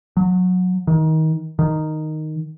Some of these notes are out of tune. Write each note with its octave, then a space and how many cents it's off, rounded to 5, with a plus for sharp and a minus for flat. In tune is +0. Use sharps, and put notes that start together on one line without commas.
F#3 -20
D#3 +25
D#3 -5